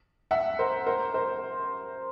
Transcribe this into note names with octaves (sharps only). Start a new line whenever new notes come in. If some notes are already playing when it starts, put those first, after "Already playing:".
E5 F#5
A#4 C5
A#4 C5
A#4 C5